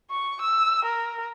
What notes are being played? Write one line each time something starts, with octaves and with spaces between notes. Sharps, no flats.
C#6
E6
A#4